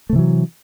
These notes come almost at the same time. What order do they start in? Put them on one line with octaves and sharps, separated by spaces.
A3 C3 E3 F#3